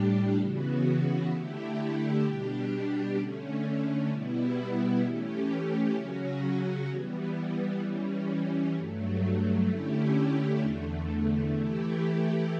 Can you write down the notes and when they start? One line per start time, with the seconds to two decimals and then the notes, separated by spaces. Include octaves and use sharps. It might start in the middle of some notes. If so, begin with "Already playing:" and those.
Already playing: A2 G3 D4 G4
0.37 C#3 E3 B3 F#4
1.30 D3 A3 E4 G4
2.22 B2 G3 D4 G4
3.16 D3 A3 C#4
4.08 B2 G3 B3 E4
5.01 E3 A3 C#4 G4
5.94 C#3 F#3 C#4 F#4
6.87 E3 G3 B3
7.80 E3 G3 C#4
8.74 G2 F#3 A3
9.66 D3 A3 C#4 E4 G4
10.59 E2 D3 A3
11.52 E3 A3 E4 G4